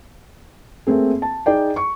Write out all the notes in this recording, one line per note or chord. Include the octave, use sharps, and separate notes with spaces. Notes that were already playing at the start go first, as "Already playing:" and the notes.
A3 A#3 C4 G#4
A5
D#4 G#4 D5 G5
C#6